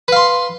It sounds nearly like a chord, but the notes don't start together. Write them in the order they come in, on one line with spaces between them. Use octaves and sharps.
B4 F5 C6